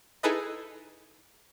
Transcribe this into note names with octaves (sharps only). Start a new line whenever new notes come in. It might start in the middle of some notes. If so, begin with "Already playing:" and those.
D#4 E4 G#4 A4 B4 D#5